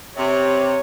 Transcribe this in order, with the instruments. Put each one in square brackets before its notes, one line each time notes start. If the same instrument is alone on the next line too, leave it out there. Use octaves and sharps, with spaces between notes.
[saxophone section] C3 [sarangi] C#5